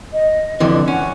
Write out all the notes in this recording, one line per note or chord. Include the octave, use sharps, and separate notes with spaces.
D#5
F2 D3 E3
C#4 F#5